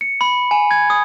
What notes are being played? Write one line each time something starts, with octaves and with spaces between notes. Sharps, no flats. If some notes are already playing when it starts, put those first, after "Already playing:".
C#7
B5
G#5
G#6
D#6